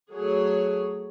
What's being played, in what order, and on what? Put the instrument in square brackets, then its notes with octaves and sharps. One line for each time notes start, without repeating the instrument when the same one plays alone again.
[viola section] F#3 A3 G#4 C#5